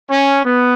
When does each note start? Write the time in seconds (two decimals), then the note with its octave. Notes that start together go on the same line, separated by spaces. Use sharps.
0.10 C#4
0.44 B3